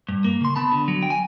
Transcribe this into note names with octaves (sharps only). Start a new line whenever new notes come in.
G2
A#3
C#3 C6
B3 A5 B5
D3
F#3
G5
G#5